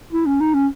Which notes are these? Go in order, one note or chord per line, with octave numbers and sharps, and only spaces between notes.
E4
C#4
D#4
C#4